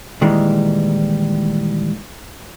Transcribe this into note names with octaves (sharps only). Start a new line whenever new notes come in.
A#2 D#3 E3 G3 G#3